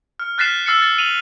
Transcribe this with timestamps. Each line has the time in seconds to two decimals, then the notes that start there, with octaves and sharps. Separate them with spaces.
0.19 F6
0.38 F6 F#6 A6 B6 C7 E7
0.66 E6 F6 A6 C7 C#7
0.82 A6
0.98 D#7 F7 F#7